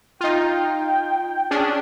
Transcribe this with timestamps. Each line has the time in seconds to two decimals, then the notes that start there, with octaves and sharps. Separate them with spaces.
0.21 D#4 F4 G5
1.51 C#4 D4 G#4